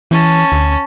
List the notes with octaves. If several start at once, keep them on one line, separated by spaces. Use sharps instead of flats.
E3 C#4 A5
D2